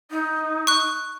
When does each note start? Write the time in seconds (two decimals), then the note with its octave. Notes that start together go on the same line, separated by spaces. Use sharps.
0.10 D#4
0.67 C#6 F#6